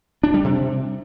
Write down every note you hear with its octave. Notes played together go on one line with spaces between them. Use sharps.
D4
G3
C3